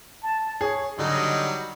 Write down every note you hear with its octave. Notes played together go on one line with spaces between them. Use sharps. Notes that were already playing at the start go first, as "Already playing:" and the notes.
A5
G#4 C#5
D3 F#3 G3 D#4 D#5